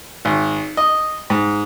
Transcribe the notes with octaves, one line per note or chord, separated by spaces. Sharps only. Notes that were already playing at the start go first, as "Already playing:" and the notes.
G#1
D#5
G#2